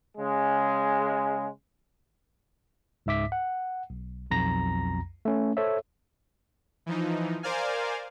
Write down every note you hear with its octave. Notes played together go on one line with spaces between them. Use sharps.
C#3 G#3
C#2 G#2 E5 D6 B6
F#5
B1
B1 F2 A#5 A#6
A3 C#4
A4 C5 C#5 E5
E3 F3 D#4
A#4 C5 D5 F5 G#5